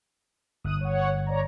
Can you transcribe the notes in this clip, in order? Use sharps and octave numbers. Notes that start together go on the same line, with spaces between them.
G1 D#6 F#6 D#7
C#5 F#5
C#5 D5 A#5